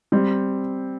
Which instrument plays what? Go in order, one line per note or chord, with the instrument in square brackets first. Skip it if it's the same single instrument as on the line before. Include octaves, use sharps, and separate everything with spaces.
[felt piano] G3 C4